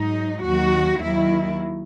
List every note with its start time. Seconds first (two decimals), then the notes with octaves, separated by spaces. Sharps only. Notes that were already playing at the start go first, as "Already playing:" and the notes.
Already playing: G#2 F#3 D#4
0.45 D#2 D#3 F#3 F#4
1.00 D#2 D#3 F#3 E4